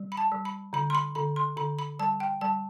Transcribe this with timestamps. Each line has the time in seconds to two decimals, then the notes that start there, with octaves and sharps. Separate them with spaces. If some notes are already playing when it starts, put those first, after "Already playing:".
Already playing: G3
0.12 B5
0.17 A5
0.32 G3
0.45 B5
0.73 D3 B5
0.90 C6
0.95 B5
1.15 D3 B5
1.36 C6
1.57 D3 B5
1.79 B5
1.99 G3 A5
2.20 G5
2.41 G3 A5